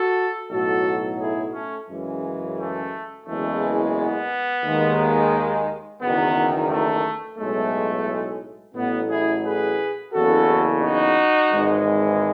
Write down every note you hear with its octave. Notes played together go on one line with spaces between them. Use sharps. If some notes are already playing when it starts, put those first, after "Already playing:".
Already playing: F#4 A4
B1 A2 F#3 F#4 A4
E4 G#4
A3 C#4
F#2 C#3 E3 G#3
A3
F#1 E2 C#3 E3 G#3 A3
B3
D#2 D#3 G#3
F#1 E2 D#3 B3
A3
B1 A2 G#3 A3
A1 A2 F#3 B3
E4 G#4
G#4 B4
F#1 E2 C#3 F#4 A4
D#4 F#4
G#1 G#2 E3 G#3